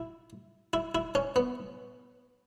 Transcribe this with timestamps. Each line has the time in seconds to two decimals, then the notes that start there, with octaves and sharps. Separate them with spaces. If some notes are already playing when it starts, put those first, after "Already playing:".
Already playing: E4
0.73 E4
0.95 E4
1.15 C#4
1.36 B3